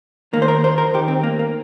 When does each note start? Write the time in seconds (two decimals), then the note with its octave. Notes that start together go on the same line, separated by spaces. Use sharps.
0.33 D#3 A#3
0.37 D#2
0.42 C5
0.48 A#4
0.64 C5
0.78 A#4
0.94 D#2 D#3 G4
1.08 C4
1.23 A#3
1.39 A#3